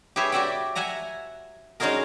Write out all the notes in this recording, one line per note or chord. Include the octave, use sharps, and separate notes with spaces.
G4 G#4 B4 C#5 E5
F#4 G4 D5 E5 F#5 G5
E5 F#5 G#5 A#5
G#3 C#4 D#4 F#4 G#4 A#4